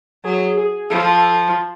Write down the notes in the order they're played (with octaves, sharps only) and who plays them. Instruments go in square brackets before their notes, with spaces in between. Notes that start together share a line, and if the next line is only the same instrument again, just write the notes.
[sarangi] F#3 [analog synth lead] G#4
[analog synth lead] G#4
[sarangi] F3 [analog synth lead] A4